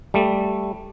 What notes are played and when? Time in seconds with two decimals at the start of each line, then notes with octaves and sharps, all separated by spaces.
0.14 G3 A3